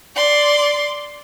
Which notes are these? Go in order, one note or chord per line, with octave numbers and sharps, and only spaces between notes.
D5 C6